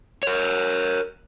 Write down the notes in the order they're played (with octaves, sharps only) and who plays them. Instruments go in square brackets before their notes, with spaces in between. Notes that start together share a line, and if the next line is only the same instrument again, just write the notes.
[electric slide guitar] A#4 C#5